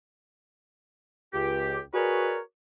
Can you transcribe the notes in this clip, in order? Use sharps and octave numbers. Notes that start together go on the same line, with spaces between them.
C#2 G4
F#4 G#4 A#4 B4 C#5 D5